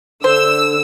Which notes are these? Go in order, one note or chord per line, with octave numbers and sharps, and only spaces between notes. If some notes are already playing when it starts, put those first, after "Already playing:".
D3 C5 E6